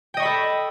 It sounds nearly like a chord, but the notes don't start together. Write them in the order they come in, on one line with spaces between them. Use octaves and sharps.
G5 D#5 C#6 B5 A4